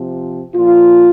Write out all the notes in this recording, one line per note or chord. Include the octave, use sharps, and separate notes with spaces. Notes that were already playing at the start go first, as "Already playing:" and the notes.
Already playing: C3 F3
A#2 F3 F4